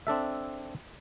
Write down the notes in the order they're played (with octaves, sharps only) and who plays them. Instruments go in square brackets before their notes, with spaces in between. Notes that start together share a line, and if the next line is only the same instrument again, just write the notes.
[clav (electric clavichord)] C4 D4 A4 E5